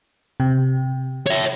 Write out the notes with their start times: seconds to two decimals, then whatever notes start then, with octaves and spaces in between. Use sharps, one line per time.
0.40 C3
1.26 C#5 E5